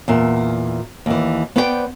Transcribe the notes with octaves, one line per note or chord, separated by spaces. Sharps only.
E2 A#2 E5
D#2 E3
B3 B4 C5 D5 D#5 G5